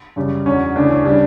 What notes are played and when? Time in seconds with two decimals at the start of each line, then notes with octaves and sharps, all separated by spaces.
0.16 F#2 C#3 G3
0.46 E2 D3 F#3 C#4
0.75 D2 C#3 E3 D4
0.90 C#4
1.05 C#3 G3 D4